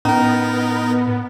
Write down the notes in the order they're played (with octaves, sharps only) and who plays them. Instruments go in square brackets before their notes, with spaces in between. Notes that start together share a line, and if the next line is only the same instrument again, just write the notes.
[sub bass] A2 [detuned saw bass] B3 [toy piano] C#4 A#5 [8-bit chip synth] D#4 A#4